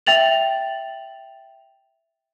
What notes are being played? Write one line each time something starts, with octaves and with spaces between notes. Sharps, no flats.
E5 G5 A6 F7 F#7